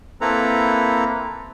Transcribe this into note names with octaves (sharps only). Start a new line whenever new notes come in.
A#3 C4 E4 A4 B4 A#5